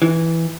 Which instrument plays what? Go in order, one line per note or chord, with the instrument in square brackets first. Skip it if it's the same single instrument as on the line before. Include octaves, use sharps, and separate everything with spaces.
[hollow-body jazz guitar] E3